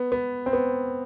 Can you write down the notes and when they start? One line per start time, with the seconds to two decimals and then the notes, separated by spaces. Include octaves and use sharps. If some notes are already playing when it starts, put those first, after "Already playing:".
Already playing: B3
0.12 B3
0.46 C4
0.53 B3